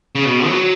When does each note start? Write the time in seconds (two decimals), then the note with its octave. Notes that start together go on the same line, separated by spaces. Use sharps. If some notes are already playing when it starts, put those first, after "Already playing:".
0.15 C#3
0.25 B2
0.47 F#3